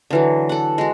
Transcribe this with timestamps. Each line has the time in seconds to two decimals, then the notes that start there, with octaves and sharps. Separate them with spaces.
0.10 D3 E3 F#3
0.49 A4 F#5
0.78 G#3 F#4